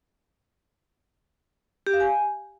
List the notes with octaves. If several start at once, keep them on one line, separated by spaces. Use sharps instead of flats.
G4
F5
G#5